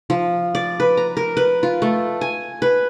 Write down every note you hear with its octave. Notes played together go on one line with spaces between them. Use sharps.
F3
D5
B4
A#5
A#4
B4
F4
A3
G#5
B4